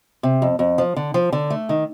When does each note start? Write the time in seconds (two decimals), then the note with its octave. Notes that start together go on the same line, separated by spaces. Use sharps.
0.23 C3
0.42 F2
0.59 F2
0.78 F3
0.96 D3
1.14 F3
1.33 D3
1.50 A3
1.69 D#3